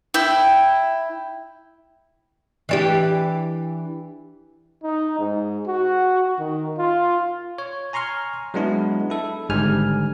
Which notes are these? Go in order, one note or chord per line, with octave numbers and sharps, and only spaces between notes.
E4 G5
E3 D4 G4
D#4
G#2
F#4
D#3
F4
C#5
G#5 A#5 C6 C#6 F6
F#3 G#3 B3 D4 E4
E4 A4
G#1 G#2 D3 G3 G#5 F6